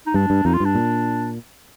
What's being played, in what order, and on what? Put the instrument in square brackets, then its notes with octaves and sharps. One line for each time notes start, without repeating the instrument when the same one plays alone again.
[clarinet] D#4
[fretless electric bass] G2 [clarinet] D4
[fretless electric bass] G2
[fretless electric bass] F2 [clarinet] D#4
[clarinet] F4
[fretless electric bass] G2 [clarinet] D4
[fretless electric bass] A#2